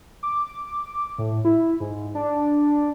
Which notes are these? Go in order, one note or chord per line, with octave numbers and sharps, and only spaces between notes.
D6
A2
E4
G#2
D4